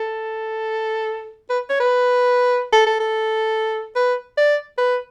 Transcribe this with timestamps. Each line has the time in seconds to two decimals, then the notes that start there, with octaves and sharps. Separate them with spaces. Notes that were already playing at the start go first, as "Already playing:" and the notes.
Already playing: A4
1.50 B4
1.70 C#5
1.80 B4
2.72 A4
2.87 A4
3.00 A4
3.96 B4
4.37 D5
4.78 B4